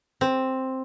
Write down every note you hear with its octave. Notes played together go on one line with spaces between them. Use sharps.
C4